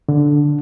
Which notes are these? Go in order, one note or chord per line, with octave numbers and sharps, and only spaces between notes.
D3